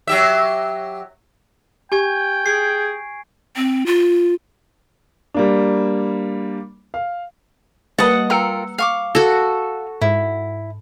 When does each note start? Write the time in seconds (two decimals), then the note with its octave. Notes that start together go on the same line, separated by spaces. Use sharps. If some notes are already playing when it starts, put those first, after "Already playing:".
0.07 F#3 G4 E5
1.92 G4 G5 G#5 C#6 G#6
2.46 G#4 C7 D7
3.56 C4
3.86 F4
5.34 G3 A#3 D4
6.94 F5
7.99 G3 A#3 B4 D#5 F#5 A5
8.30 F4 A#4 G5 A#5 E6 C#7
8.78 F5 C#6 D6
9.15 F#4 A4
10.01 G#2 E4